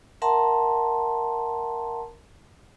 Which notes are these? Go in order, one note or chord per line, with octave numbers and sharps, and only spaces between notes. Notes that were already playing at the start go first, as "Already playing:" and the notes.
A#4 E5 F#5 A5 A#5 C6